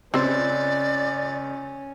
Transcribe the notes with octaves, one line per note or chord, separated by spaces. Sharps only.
C#2 C4 C#4 C5 D5